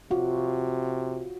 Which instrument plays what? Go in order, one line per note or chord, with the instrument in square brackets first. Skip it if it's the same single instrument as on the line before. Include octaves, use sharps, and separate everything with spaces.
[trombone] C3 [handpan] F4 F#4